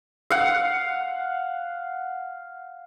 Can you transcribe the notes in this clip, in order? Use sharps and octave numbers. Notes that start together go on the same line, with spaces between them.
F5 F#5